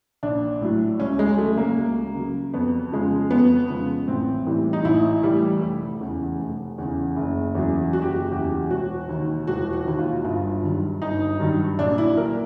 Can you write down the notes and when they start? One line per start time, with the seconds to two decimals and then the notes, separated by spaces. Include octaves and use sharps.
0.23 A#1 D4
0.61 A2 F#3
1.00 C#2 C#4
1.19 G#3
1.38 C#3 F#3 A3
1.58 A#3
1.77 C#2
2.15 C#3 F#3
2.54 F2 B3
2.92 C#3 F3 G#3
3.31 F2 B3
3.70 C#3 F3 G#3
4.08 A1 C4
4.46 A2 E3 G3
4.73 D#4
4.85 A1 E4
5.23 A2 E3 G3
5.62 F1
6.01 E2 C#3
6.39 F1
6.78 E2 C#3
7.16 F#1
7.55 E2 C#3 F#3
7.93 F#1 F#4
8.02 G4
8.11 F#4
8.32 E2 C#3 F#3 G4
8.70 E1 F#4
9.09 D#2 D#3
9.47 E1 F#4
9.73 F#4
9.86 D#2 D#3
9.99 F4
10.25 G1 F4
10.63 G2 D#3 F#3
11.02 G1 D#4
11.40 G2 D#3 F#3
11.79 A#1 D4
11.98 E4
12.17 A#2 F#3 A#4